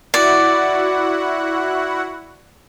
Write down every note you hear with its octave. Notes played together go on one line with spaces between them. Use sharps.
E4 F#4 D5 F#5